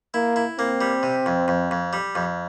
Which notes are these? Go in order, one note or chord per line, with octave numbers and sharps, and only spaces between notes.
A#3 E4
E4
A#3 C4
G3
C3
F2
F2
F2
G3
F2